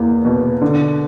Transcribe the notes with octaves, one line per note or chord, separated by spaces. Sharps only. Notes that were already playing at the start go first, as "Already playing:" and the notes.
Already playing: E2 A#3
B2
D3